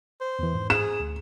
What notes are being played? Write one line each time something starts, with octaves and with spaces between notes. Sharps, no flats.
C5
E2 E3
G#2
G#4 E7
D2